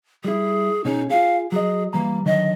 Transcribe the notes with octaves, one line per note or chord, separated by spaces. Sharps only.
G3 E4 G#4
B2 C#4 D#4 G#4
F4 G#4 F5
F#3 G#4 D#5
E3 G3 A#3 A#5
D3 D#3 F#3 D#5